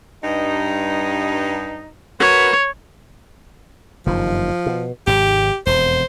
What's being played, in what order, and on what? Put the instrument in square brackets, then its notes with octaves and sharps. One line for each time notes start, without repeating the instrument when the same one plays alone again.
[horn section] G2 D#4
[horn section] F#4 A#4 B4 [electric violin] C#5
[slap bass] F#1 G2 D#3 [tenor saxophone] F3
[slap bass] B2
[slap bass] G#1 G#2 C3 [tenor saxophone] G4
[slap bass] E1 F2 [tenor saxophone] C5